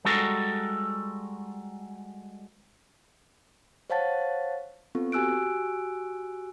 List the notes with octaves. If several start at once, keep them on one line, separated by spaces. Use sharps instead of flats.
G3 G#3 F#4 A4 A#4
C5 C#5 F5 F#5 A5 A6
B3 C4 F4 A4
F#4 G4 G#5 E6 F#6 D7